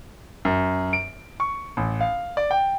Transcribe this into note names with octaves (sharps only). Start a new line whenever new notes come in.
F#2
D7
C#6
A1
F5
D5
G5